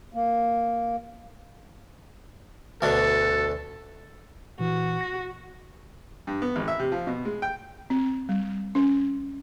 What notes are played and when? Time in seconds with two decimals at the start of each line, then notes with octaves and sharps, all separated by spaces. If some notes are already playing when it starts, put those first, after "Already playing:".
0.14 A#3
2.82 D2 B2 D3 A4
4.59 A#2 E3 F#4
5.01 A#6
6.27 G2
6.42 B3
6.56 G#1
6.68 E5
6.79 C3
6.92 F3
7.07 B2
7.25 G#3
7.42 G5
7.90 C4
8.29 G3
8.75 C#4